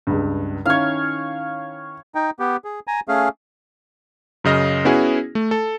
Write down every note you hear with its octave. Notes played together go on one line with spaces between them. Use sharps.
C#2 G2
D#3 C#4 E4 C#5 F5
D#4 G5
B3 G4
G#4
G#5 A#5
A3 C#4 G#4 F5
F#2 C#3 D#5 F6 A#6
B3 C#4 E4 F#4 G#4
A3
A4